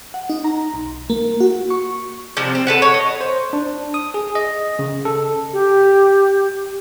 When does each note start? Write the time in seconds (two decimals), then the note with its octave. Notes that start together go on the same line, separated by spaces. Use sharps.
0.14 F#5
0.30 D#4
0.44 A#5
0.74 B1
1.10 A#3
1.40 F#4
1.70 C#6
2.37 C3 F3 G3 C4
2.55 C4
2.67 A4 B4 F#5
2.82 C#5
2.94 D#5
3.21 C5
3.53 D4
3.94 D#6
4.14 G#4
4.35 D#5
4.79 C#3
5.05 A4
5.53 G4